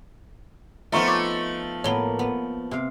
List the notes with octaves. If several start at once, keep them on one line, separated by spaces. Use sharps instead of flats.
F3 A3 B3 D#4 F4 E5 A#5 C#6
C#5 C#6 D6
A2 A#3 B3 C#5 G7
B3
C3 F5